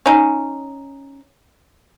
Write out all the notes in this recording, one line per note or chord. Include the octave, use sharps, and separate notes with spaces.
C#4 D#4